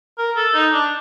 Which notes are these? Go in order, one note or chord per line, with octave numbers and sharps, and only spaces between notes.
A#4
A4
D#4
D4